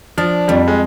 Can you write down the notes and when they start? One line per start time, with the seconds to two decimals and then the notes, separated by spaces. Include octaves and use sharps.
0.18 F3 D4
0.48 F2 G3
0.68 G#3